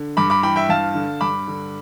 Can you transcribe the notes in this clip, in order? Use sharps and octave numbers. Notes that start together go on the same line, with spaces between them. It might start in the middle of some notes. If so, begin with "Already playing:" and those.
Already playing: D3
G2 B5 D6
B5 D6
E3 G5 B5
E5 G5
G2 F5 A5
D3
G2 B5 D6
D3